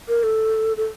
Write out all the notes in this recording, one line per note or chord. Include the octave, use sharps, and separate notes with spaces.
A#4
A4
A4